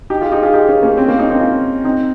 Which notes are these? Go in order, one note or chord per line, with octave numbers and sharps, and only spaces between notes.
D#4 G4
F4 G#4
D#4 G4
F4 G#4
D#4 G4
C#4 F4
A#3 C#4
G#3 C4
A#3 C#4
C4 D#4
C4 D#4
C#4 F4
C4 D#4